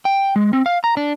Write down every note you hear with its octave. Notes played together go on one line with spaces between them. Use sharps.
G5
G#3
C4
F5
A#5
D4